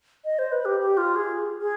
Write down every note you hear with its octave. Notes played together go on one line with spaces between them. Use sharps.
D#5
C5
B4
G4
G4
F4
G#4
G#4